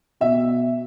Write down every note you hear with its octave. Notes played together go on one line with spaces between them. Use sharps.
B2 E5